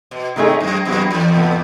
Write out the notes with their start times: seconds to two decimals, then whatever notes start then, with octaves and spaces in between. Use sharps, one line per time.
0.11 B2
0.36 A2 D#3 A3 D#4 G#4
0.60 F#2
0.85 F#2 E3 B3 F#4 B4
1.11 E2
1.35 A2 E3 B3